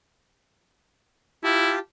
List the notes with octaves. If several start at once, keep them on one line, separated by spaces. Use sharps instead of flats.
E4 F4 G4 A5